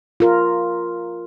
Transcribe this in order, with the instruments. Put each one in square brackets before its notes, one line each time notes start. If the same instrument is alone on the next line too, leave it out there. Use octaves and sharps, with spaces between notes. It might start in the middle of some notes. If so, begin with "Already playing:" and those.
[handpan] F4 A#4